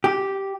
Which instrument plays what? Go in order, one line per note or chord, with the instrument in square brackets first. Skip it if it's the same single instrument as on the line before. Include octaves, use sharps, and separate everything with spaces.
[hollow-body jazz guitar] G4